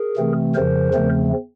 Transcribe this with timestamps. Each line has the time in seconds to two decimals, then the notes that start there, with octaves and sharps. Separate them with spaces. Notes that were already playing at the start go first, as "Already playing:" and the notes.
Already playing: G#4 A#4
0.17 C3 E3 A3 C4
0.55 F2 C#3 F3 A#4 C5
0.94 E2 C#3 F3 A3 C4